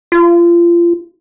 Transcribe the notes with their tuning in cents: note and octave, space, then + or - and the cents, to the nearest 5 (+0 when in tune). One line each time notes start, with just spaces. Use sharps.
F4 -30